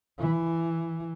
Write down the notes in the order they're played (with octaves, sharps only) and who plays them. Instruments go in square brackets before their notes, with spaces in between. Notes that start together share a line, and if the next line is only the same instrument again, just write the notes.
[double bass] E3